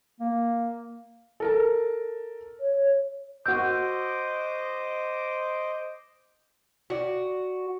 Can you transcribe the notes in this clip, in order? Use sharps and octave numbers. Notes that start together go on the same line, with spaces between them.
A#3
A4 A#4 A5
C#5
F#4 C5 D#5 D6 E6 G6
F#4 D5